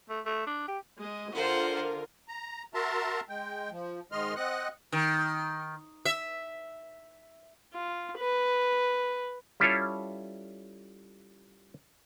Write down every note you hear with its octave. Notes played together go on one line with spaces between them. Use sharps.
A3
A3
D4
G4
G#3 D#5
D3 F4 A#4 C5 F#5
A#5
F#4 A#4 E5 A5 A#5 C6
G#3 G5
F3
G#2 D#3 G#3 D#5 C6 F6
C4 D#5 F#5 F#6
D#3
E5
F4
B4
G3 C#4 E4 F4 A4 C#5